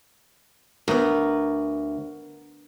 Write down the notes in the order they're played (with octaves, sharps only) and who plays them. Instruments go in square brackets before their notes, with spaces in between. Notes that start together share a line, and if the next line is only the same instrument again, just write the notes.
[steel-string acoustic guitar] D2 [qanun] B3 A#4